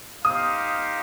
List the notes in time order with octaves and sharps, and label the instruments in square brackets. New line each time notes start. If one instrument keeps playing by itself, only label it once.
[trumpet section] D#4 G4 C5 F5 [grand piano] D#6